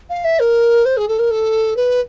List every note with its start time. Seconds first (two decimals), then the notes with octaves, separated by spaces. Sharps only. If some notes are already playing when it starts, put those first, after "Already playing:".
0.10 F5
0.24 E5
0.40 A#4
0.85 C5
0.97 G#4
1.08 A4
1.19 A#4
1.31 A4
1.76 B4